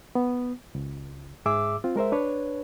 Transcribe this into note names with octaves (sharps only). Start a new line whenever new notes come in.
B3
C#2
G#2 G#4 E5 D6 E6
C4 F4
G#3 A#4 C5 E5
D4 B4 C#5